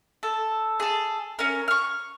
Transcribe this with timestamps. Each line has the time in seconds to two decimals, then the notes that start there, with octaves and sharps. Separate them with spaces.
0.23 A4
0.80 G#4 A4
1.39 C#4 A#4
1.68 C#6 F6